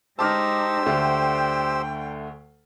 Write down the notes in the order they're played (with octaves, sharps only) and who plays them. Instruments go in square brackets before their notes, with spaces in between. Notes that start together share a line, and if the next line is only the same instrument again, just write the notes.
[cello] G#3 D#4 [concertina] G4 C5 E6 [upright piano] A5 D6 F6
[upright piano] D2 D3 A3 [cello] G5